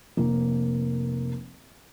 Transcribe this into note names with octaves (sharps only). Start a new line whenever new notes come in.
F1 A#3